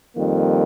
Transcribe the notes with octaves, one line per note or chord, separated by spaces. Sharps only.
F2 D#3 G3 A#3